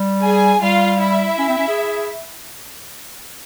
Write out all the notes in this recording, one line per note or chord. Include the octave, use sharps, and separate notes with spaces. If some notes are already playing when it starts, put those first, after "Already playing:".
Already playing: G3
G#4 G#5
G3 F4 F5
E4 E5
C#4
C4
C#4
G#4